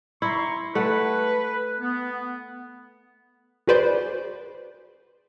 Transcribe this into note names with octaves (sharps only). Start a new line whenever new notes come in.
E4 A#5 C6 C#6
A3 B4 F#5
B3
F#4 G#4 B4 C5 D5